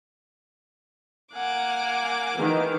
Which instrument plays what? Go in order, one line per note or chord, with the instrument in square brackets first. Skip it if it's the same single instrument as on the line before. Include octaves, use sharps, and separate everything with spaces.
[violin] A#3 D6 [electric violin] F#5 G#5
[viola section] D#3 E3